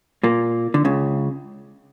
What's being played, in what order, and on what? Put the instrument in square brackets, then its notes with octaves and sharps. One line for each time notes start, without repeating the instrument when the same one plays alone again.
[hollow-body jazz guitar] A#2 A#3
D3
C#2 C#3